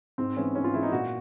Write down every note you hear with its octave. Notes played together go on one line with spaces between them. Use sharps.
G#2 C4
E3 G#3 B3 C#4
G#2 C#4
F4
E3 G#3 B3 E4
D#4
A#2 F#4